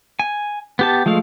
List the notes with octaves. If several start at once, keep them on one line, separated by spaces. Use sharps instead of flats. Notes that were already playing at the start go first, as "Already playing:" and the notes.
G#5
B3 G4 A5
F3 G#3 A3 F5